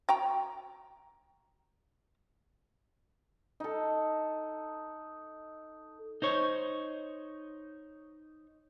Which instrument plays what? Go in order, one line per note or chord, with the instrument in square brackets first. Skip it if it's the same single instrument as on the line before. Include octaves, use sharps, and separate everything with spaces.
[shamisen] F#4 G5 A#5
[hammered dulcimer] D#4 A4
[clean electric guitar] D#4 C5 C#5